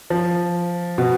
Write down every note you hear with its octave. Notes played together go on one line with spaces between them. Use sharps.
F3
B2